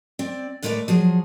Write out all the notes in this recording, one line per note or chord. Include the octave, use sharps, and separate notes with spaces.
C4 D5
A2 G#3 A3 A#4 B4 D5
F3 F#3 G#4